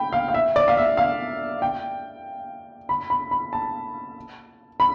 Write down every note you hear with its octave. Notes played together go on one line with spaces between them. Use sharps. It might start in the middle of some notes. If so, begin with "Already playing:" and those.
Already playing: G5 B5
F5
F5
E5
D5
F5
E5
F5
G5
B5
B5
B5
A5
B5